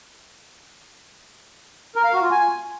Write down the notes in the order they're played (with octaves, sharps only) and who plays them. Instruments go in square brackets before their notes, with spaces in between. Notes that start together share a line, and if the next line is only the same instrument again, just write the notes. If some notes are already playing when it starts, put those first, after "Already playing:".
[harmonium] A#4
F5
F#4
F4
G#5